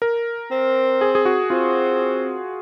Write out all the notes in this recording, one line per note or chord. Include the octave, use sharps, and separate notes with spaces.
A#4
C4
G#4
G#4
F#4
C4 F4